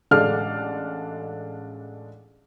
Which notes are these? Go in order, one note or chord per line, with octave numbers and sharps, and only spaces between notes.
A1 G#3 D4 A4 F5 F6